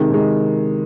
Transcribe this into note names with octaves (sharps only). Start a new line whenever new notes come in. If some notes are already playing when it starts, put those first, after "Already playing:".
Already playing: C3 D#3 G#3
C3 D#3 G#3